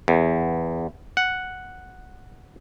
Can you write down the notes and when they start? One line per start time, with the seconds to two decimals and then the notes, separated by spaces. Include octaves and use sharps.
0.08 E2
1.17 F#5